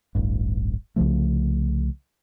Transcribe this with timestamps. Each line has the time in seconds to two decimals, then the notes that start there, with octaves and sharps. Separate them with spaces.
0.15 D1 A1 G2
0.96 C2 C#3 F3 A3